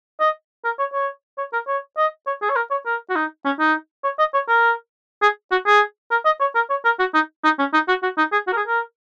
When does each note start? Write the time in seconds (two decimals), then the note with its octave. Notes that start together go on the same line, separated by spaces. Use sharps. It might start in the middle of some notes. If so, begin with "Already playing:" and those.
0.20 D#5
0.65 A#4
0.79 C#5
0.94 C#5
1.38 C#5
1.53 A#4
1.68 C#5
1.97 D#5
2.27 C#5
2.42 G#4
2.49 C#5
2.56 A#4
2.71 C#5
2.86 A#4
3.09 F#4
3.15 D#4
3.45 C#4
3.60 D#4
4.04 C#5
4.19 D#5
4.34 C#5
4.48 A#4
5.22 G#4
5.51 F#4
5.67 G#4
6.11 A#4
6.25 D#5
6.41 C#5
6.55 A#4
6.70 C#5
6.85 A#4
6.99 F#4
7.14 D#4
7.44 D#4
7.59 C#4
7.73 D#4
7.88 F#4
8.03 F#4
8.18 D#4
8.32 G#4
8.47 F#4
8.53 A#4
8.57 G#4
8.67 A#4